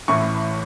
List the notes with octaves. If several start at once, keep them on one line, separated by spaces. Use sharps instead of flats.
A1 A2 E3 C#6